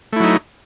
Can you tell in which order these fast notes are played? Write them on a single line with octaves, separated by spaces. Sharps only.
A3 E4 F#3 D#4